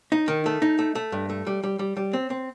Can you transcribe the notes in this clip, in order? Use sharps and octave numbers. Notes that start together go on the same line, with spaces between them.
D#4
D#3
A3
D#4
A3
A3
G2
A3
G3
G3
G3
G3
C4
C4